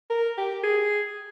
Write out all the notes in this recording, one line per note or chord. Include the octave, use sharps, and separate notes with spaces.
A#4
G4
G#4